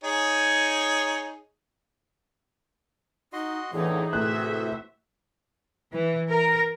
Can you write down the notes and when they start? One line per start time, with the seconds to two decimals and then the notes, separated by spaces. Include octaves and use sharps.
0.04 D#4 G#4 C#5
3.33 D#4 F#4 D#5 C6
3.73 E2 A2 D3 E3 D#4 G#4
4.13 A2 C3 E3 F#4 C5 E5 F#6
5.93 E3
6.30 A#4